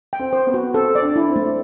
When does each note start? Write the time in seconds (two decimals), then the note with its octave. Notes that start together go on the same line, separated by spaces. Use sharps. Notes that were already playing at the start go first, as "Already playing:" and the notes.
0.13 G5
0.19 C4
0.33 C5
0.47 B3
0.54 F#4
0.74 C4 A4
0.95 D5
1.02 D4
1.16 E4
1.30 C4
1.36 A3